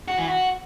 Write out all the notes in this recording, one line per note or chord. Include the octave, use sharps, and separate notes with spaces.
F#4
E3
F#4